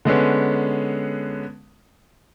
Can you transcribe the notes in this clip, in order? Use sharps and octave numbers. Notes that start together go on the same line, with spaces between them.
D3 G#3 B3 C#4